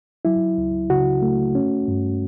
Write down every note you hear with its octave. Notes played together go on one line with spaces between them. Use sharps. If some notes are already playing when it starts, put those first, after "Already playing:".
F#3 E4
C#2
C#3 F#4
A3
C#4
G2